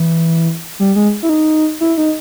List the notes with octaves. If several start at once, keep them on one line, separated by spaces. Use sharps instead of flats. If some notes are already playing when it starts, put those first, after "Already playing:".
Already playing: E3
G3
G#3
E4
D#4
E4
D#4